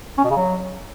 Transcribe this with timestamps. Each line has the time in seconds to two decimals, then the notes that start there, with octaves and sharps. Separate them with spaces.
0.18 C#4
0.24 B2
0.30 C#3
0.37 F#3